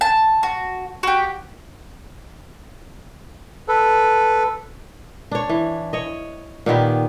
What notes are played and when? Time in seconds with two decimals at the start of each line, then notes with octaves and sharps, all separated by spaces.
0.01 A5
0.43 F#4
1.03 F#4 G4
3.68 A4 B4
5.31 D4 C#5
5.49 E3
5.93 C#5 D#5
6.66 A#2 D#3 B3 G4